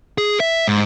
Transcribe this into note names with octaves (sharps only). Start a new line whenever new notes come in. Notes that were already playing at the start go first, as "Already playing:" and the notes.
G#4
E5
G#2